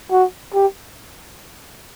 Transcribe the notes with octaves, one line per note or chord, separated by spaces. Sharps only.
F#4
G4